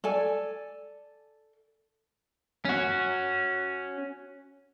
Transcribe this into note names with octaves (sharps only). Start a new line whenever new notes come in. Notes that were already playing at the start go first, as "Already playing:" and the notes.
A4 D5 G#5
C#4 F#4